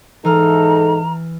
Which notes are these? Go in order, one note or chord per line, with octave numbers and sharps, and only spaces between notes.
G#2 E3 D#4 A4 A#5 F6